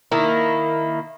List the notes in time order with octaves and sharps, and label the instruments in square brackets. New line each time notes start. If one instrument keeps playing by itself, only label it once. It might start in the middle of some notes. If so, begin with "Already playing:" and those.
[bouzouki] D#3 A#3 E4